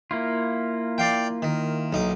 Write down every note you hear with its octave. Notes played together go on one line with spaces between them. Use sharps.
A#3 E4 F4
D5 F5 G5
D#3
B1 D#4